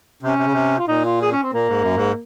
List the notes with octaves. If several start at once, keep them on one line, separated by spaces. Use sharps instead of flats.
C3 C#4
C3
C#3
C3
F4
A#2 D#4
F4
G#4
C#4
C4
A#2 A#3
G#2
F#2
G#2